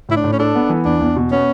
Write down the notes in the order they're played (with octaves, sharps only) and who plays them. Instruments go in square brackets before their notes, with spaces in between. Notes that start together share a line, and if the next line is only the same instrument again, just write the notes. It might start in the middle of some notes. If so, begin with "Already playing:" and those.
[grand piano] A2 [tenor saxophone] E4
[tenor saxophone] D4
[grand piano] A2
[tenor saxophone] C#4
[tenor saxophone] D4 [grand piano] A4
[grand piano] B3
E3
[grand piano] E2 [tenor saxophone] D4
[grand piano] E2
B2
[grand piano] B3 [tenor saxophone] C#4